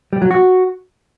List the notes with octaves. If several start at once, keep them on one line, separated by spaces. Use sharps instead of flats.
G3
F#3
F#4